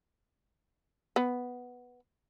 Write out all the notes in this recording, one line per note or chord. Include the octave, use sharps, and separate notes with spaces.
B3